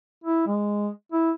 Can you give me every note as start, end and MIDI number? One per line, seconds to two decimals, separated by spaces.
0.24 0.46 64
0.47 0.89 56
1.12 1.31 64